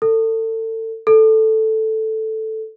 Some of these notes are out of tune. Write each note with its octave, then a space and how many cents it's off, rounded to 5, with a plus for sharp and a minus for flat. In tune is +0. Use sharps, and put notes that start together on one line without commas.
A4 +30
A4 +0